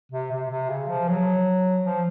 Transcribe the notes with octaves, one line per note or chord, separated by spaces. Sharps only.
C3
C3
C3
C#3
F3
F#3
F3